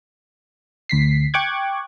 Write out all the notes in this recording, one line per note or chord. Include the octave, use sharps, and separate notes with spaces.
D2 B6 C7
G5 C#6 D6 F#6 G#6